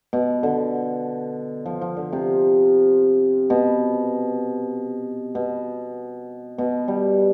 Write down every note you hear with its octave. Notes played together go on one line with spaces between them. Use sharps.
B2
D3
F3
F3
D3
C3
B2
B2
B2
G3